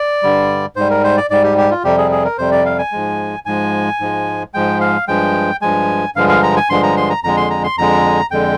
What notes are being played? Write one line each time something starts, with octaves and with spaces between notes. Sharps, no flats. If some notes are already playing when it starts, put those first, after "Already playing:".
Already playing: D5
G2 D3 G3
G#2 G3 C5
A#4
C5
D5
G#2 G3 D5
G4
G4
F4
F2 C3 G3 G4
G#4
G#4
A#4
F2 C3 G3 C5
D5
F5
G#5
G#2 F3 G#3
G#2 F3 G#3 G#5
G#2 F3 G#3
G#2 F3 G#3 G5
F5
G2 F3 G#3 G5
G2 F3 G#3 G#5
G2 D3 F3 G#3 F5
F5
A#5
G#5
G2 D3 F3 G#3 C6
A#5
C6
A#5
F2 D3 G#3 A#5
C6
A#5
C6
F2 D3 G#3 A#5
F2 D3 G#3 G5